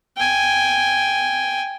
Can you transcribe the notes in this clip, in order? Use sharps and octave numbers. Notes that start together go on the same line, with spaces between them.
G5 G#5